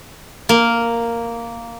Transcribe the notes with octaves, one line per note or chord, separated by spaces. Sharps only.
A#3